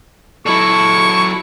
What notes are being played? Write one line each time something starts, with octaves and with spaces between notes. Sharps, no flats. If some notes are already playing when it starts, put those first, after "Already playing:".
F#3 E4 A4 C#6